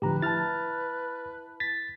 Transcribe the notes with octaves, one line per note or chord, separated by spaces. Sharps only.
A2 D3 F3 G4 B4 A#5
E4 A5 F6 A6
A6 B6